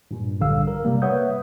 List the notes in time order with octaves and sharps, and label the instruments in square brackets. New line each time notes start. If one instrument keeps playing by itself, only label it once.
[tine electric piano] G2 A#2
A#1 D3 G3 F5 E6
A#4
C3 G3 A#3
B4 C#5 E5 F#5 D#6 G6